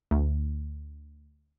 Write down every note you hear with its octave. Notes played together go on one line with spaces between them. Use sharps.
D2